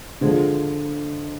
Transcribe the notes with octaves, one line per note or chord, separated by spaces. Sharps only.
D3 F3 G#3